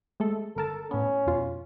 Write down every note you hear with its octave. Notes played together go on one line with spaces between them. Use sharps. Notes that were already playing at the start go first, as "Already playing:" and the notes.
G#3 A3 A4
G1 A4 A#4 A5
A2 B3 C#4
F2 B2 F4